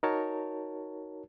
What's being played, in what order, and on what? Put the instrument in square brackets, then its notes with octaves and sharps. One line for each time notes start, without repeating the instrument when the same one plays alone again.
[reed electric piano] D#4 F#4 A#4 C#5 A5